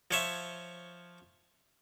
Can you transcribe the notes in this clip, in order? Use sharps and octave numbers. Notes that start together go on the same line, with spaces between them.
F3 C#5 E5